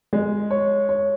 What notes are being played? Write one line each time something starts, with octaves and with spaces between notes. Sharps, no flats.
G#3
C#5
C#5